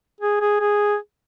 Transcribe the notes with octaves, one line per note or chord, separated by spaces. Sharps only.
G#4
G#4
G#4